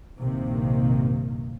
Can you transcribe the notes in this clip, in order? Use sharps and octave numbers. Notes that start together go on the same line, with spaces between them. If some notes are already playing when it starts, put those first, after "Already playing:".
A#1 G2 C3 D#3 A#3